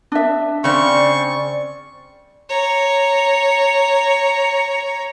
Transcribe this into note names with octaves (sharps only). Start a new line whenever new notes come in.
D4 E5
C#3 C4 D5 C#6
C#5 A#5